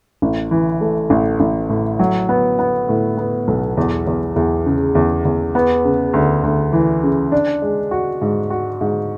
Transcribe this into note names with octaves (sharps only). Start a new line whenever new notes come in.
A1
E3
A3
A1
A1
A2
F#3
B3
B3
A2
B3
B1
E2
E2
E2
C#3
E2
E2
B3
C#3
D2
D2
E3
C#3
D4
G#3
F#4
G#2
F#4
G#2